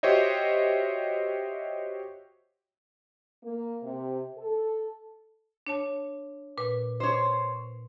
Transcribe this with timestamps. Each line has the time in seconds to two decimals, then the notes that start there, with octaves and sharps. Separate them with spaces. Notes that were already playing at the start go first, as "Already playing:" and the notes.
0.03 F#4 G4 C5 C#5 D#5 E5
3.43 A#3
3.82 C3
4.37 A4
5.67 D4 C#5 A5
6.58 A#2 B4
7.00 C5 C#5